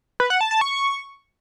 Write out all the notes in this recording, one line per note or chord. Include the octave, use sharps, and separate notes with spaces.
B4
F#5
A5
A5
C#6